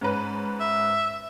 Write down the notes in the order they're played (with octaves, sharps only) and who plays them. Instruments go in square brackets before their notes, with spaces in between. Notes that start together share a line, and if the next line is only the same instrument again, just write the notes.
[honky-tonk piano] G#2 C#4 B4
[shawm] E5